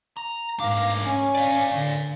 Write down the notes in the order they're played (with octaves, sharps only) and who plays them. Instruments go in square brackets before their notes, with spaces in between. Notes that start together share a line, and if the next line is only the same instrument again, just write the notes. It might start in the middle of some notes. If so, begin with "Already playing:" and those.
[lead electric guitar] A#5
[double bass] G#2 [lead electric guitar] D4 A#4 [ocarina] F5
[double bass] C#4 [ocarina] G#5
[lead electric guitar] D5 F5
[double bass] D3